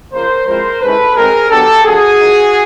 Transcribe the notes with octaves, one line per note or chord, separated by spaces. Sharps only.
C#3 F3 A#3 A#4 C5
F3 G#3 C4 E4 A#4 C5
D#3 G#3 C#4 E4 A4 B4
B2 G#3 C4 D#4 G#4 A#4
F#3 B3 D4 G4 A4
F#3 A#3 D4 F#4 G#4
F3 A#3 D#4